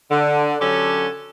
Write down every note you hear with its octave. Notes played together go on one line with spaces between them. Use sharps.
D3
D3 F#3 C#4 G4 A4